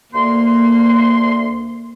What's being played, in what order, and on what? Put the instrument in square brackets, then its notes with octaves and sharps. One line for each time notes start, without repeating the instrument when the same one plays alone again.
[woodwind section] D2 C6 [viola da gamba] A#3